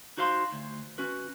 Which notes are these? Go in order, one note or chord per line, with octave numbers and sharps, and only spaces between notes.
D#4 F#4 C5 F5 C6
D2
C#4 F#4 B4